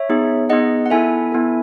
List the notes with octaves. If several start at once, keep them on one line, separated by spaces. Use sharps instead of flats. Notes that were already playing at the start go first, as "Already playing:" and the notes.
Already playing: C#5 E5
B3 D#4 G#4
B3 D#4 G#4 D#5 F#5
F#5
B3 E4 A4 E5 G#5
B3 E4 A4